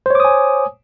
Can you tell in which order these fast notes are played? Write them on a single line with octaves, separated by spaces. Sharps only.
C5 C#5 D6 D#6 G#5